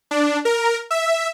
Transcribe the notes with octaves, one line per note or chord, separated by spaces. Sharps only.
D4
A#4
E5